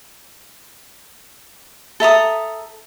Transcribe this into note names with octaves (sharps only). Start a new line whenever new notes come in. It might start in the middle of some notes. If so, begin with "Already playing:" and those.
A4 E5 A#5 D#6